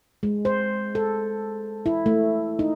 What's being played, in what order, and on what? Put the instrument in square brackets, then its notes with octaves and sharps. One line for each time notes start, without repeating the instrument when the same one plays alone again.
[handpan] G#3
C5
A4
E4
A3
D#4